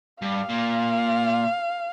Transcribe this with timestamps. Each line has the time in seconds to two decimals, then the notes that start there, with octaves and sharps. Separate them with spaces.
0.22 G2 F5
0.49 A#2